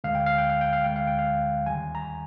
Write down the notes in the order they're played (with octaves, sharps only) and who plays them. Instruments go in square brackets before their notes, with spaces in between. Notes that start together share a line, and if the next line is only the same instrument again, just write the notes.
[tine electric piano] D2 D3 G#3 F5
G5
F5
G5
F5
G5
F5
D2 D3 G#3 G5
F5
G5
F5
D#2 D#3 G3 G#5
A#5